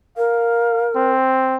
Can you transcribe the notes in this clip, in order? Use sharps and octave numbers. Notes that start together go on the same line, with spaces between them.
A#4 F5
C4